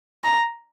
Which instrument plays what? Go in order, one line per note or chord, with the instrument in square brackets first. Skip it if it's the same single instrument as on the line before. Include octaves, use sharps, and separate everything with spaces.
[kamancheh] A#5